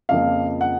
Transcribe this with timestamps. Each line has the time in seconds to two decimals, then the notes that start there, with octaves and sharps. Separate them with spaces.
0.09 F2 C#3 F3 A#3 F5
0.61 F#5